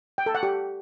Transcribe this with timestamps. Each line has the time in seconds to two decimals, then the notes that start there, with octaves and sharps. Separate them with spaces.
0.18 G5
0.26 A4
0.35 F#5
0.43 G4